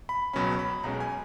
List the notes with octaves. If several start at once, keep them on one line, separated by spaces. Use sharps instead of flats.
B5
C#2 B2 F#3 C#4 B5
B5
B1 B2 G#3 C#4 A#5
G#5